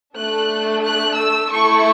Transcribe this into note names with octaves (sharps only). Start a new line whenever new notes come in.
A3 D4 A4 F#6
F#6
E6
A3 E4 A4 C#6